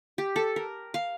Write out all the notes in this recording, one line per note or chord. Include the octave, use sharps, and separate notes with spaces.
G4
A4
A#4
F5